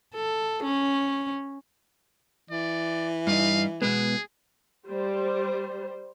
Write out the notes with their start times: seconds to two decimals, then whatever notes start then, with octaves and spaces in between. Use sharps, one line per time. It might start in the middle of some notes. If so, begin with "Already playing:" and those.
0.14 A4
0.63 C#4
2.50 E3 D5
3.27 G2 D#4 F5
3.82 B2 G#3 B3 G#4
4.85 G3 C5